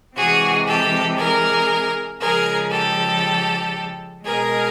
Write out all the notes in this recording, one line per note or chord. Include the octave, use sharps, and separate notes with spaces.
C3 E3 G#3 F#4 G#4
G4 A4
G#4 A#4
C#3 F3 G#3 G#4 A#4
G4 A4
B2 G#3 G#4 A#4